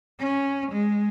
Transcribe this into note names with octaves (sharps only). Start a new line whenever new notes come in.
C#4
G#3